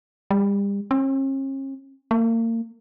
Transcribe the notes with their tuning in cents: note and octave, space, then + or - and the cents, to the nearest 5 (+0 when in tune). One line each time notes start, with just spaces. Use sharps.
G3 +35
C#4 -45
A#3 -35